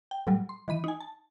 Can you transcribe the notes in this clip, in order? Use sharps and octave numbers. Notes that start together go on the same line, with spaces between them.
G5
A2 F#3 G3
C6
D#3 E3 B5 D#7
D#4 G#5
A5